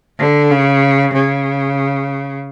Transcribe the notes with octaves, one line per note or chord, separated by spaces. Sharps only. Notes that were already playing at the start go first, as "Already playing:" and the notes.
D3
C#3
C#3